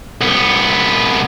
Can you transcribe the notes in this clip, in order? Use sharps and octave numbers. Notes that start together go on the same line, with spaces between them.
C2 B3